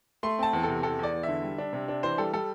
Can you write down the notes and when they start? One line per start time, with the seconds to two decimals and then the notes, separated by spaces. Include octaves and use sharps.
0.23 A3 C6
0.39 C4 A5
0.53 E2
0.63 C3 A4
0.83 E2 A4
0.99 E2 D5
1.13 E2
1.23 D3 E5
1.43 G3
1.58 D4
1.73 C3
1.88 D4
2.03 E3 C5
2.18 G3 A4
2.33 G3 A4